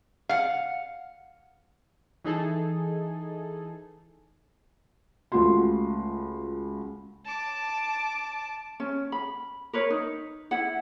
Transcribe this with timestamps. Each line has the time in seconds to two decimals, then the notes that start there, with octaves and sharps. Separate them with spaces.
0.29 F5 F#5
2.24 E3 D#4 G#4 A4
5.32 C#2 A3 F4 F#4 C6
7.25 A5 D6
8.80 C#4
9.12 B5
9.73 A#4 B4 C#5
9.90 D#4
10.51 E4 F#5